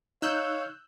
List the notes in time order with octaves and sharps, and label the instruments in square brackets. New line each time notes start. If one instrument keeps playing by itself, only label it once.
[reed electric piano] D#4 [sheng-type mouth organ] C#5 F5 [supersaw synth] E6 F#6 G6